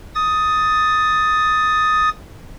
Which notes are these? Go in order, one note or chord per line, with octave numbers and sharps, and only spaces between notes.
D#6 A6